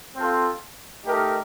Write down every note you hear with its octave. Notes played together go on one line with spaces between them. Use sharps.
C4 F4 A4
A3 D#4 G4 A#4